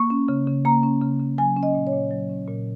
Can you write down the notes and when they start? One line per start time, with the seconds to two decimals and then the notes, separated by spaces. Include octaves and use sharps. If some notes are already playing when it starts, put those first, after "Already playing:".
Already playing: A#3 C#6
0.10 C#4
0.28 C#3
0.47 C#3
0.65 A#3 A#5
0.83 C#4
1.01 C#3
1.20 C#3
1.38 F#3 G#5
1.57 C#4
1.63 D#5
1.75 A#2
1.87 C#5
1.93 A#2
2.11 F#3
2.29 C#4
2.48 A#2